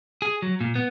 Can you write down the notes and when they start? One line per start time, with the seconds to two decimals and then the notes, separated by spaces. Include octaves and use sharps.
0.22 G#4
0.42 F#3
0.61 A#2
0.76 B3